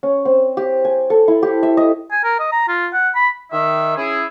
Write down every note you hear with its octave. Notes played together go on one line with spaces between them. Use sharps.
C#4
C4
G4
G#5
A4
E4
G4
E5
D#5
G#5
A#4
D#5
A#5
F4
F#5
B5
D#3 E5
C#4 E4 G#4